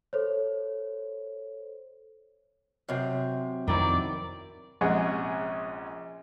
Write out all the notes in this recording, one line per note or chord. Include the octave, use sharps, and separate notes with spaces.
A4 C5 C#5
F#2 C3
F2 D#3 F#3 B3 C4 E4 D5
A#1 C3 G#3 C#4 G#4 F#5